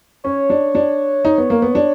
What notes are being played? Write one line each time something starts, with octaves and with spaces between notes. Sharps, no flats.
C#4 C#5
D4
D4
D#4
B3
A#3
B3
D4